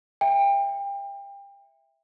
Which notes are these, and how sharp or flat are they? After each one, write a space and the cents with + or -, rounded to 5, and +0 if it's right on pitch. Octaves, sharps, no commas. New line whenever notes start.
E5 +0 G5 +30